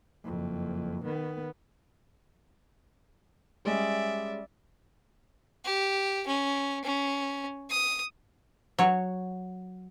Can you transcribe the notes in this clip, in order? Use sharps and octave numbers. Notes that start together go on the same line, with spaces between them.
F#1 F2
D#3 B3
G3 G#3 C#4 D5 E5
G4
C#4
C#4
D#6
F#3 C#5